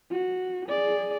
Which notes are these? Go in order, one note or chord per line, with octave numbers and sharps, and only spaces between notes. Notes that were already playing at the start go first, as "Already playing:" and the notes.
F#4
G#4 D5